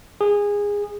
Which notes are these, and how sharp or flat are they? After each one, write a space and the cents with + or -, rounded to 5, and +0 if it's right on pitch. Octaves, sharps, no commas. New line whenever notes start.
G#4 -20